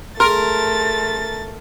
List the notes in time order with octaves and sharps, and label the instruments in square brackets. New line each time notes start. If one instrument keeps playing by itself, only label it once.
[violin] A3 A6 [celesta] G#4 C6 [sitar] A#4